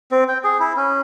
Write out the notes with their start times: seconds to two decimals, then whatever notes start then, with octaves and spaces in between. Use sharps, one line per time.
0.11 C4
0.28 G5
0.44 G#4
0.60 E4
0.77 C#4